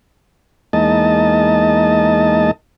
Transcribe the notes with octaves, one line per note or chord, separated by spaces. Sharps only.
E2 G#3 A#3 D#4 D#5 A5